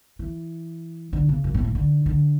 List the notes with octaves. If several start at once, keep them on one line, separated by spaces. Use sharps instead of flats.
E3
D3
C#3
F#2
A2
C#3
D3
D3